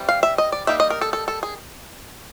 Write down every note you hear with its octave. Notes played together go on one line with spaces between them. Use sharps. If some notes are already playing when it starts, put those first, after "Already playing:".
Already playing: E3 G3 C4
F5
E5
D#5
D5
G3 A#3 D#4 E5
D#5
A#4
A4
A4
A4
G#4